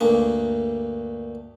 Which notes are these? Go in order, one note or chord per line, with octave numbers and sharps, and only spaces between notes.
D2 G2 A#3